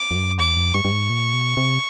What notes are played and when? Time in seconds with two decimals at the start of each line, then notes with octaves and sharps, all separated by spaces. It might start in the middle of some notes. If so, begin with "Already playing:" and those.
Already playing: D6
0.11 F2
0.15 F#2
0.39 E2 D6
0.57 F2
0.74 G2 C#6
0.85 G2
0.92 G#2
1.10 A#2
1.33 B2
1.57 C3